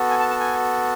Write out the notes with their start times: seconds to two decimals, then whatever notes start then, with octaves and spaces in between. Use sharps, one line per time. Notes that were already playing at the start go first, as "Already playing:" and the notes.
Already playing: B3 F#4 A4
0.10 G#5
0.20 A5
0.30 A5
0.40 G#5